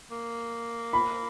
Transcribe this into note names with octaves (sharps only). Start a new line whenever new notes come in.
A#3
B5